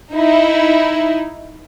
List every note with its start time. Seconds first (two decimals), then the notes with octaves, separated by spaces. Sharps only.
0.14 D#4 E4